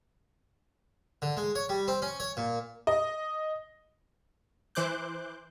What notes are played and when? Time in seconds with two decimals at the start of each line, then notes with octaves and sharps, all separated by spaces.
1.22 D3
1.37 G#3
1.55 C#5
1.69 G3
1.88 C4
2.02 C#4
2.20 C#5
2.37 A#2
2.87 D#5
4.75 E3 C5 D6 F#6 G6